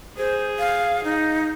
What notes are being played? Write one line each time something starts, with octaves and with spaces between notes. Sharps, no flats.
G#4 C5
F5
D#4